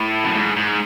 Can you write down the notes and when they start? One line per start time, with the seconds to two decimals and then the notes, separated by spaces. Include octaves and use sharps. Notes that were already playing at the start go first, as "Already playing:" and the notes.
Already playing: A2
0.24 F#2
0.34 G#2
0.56 G#2